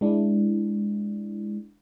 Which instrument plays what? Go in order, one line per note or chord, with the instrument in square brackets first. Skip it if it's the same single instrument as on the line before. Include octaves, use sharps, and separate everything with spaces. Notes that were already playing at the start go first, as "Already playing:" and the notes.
[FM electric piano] G#3 D4 E4